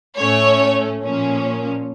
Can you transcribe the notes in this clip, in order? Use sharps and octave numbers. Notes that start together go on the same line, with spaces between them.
A2 A3 C#4 C#5
A#2 F3 A#3 C#4